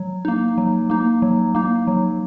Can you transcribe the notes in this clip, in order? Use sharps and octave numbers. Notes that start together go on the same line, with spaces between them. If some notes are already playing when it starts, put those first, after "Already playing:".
Already playing: F#3
A#3 D#4
F#3
A#3 D#4
F#3
A#3 D#4
F#3